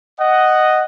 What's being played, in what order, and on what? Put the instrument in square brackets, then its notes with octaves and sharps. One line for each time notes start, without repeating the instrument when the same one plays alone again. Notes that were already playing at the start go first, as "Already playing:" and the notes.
[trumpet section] D#5 F#5